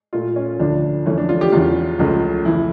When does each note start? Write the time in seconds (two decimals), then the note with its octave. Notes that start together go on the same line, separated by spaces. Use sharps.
0.13 A#2 A3 F4
0.36 C#4
0.59 D2 D3 F3 D4
1.06 F2 E3 A3 C#4
1.18 D4
1.29 F4
1.41 G4
1.52 E2 C#3 E3 F4
1.99 C#2 C#3 F3 A3
2.45 F2 E3 A3 E4